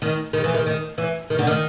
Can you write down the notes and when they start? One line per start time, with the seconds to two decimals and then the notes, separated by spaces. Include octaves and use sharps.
0.02 D#3
0.33 D#3
0.44 E3
0.54 D#3
0.66 D#3
0.98 E3
1.30 D#3
1.39 D3
1.47 D#3